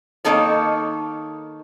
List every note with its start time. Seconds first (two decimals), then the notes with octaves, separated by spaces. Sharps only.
0.25 D#3 A#3 D#4 A4 C#5